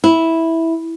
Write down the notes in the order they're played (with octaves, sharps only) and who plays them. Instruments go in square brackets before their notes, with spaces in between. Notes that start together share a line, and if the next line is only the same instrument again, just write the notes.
[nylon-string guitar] E4